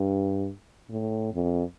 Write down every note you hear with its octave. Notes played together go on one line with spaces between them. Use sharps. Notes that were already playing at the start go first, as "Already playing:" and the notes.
Already playing: G2
A2
F2